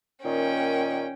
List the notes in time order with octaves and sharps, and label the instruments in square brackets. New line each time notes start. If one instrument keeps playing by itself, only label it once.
[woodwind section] A#2 D#3 [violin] C#4 G5